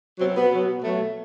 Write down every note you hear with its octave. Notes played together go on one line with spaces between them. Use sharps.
B2 F#3 C4
B3
B2 F#3
B2 F#3 A3